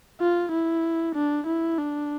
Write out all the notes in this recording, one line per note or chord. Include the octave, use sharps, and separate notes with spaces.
F4
E4
D4
E4
D4